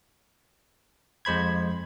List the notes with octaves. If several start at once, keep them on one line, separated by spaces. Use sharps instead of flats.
F2 G#3 C5 B5 G#6